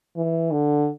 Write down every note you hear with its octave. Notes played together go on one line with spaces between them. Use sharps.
E3
D3